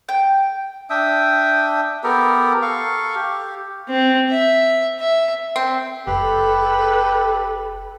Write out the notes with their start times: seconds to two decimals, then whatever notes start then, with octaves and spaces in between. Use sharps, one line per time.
0.09 G5
0.90 D4 E5 G5 D#6
2.04 B3 G4 A4 A#4
2.62 A4 F5 C#6
3.15 G4
3.89 C4
4.30 E5
5.00 E5
5.56 C4
6.07 F#1 G4 A4 B4